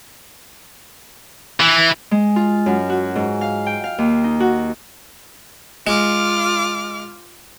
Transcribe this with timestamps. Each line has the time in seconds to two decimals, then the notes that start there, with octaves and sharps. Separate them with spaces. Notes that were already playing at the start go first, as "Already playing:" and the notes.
1.60 E3
2.11 G#3
2.36 F4
2.66 F#2
2.90 F#4
3.16 G#2
3.41 F5
3.66 G5
3.84 F5
3.98 D#2
4.24 D#4
4.40 F#4
5.87 G#3 F4 D6 F6